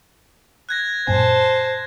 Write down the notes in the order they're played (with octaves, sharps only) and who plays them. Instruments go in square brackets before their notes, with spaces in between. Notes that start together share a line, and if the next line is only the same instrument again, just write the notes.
[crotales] F#6 G#6 A#6
[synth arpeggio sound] F#2 A#2 G#5 [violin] C5 A5